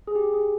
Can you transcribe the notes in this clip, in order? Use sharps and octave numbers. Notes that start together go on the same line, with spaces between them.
G#4
G4
G#4